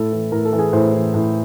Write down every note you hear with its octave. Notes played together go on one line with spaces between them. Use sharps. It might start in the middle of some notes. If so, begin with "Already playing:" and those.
Already playing: A2 A4
E3
A2 A#4
A4
E3
G#4
A2 C5
E3
A2